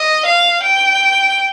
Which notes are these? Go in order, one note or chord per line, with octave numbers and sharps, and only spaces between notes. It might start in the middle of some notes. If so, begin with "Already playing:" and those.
Already playing: D#5
F5
G5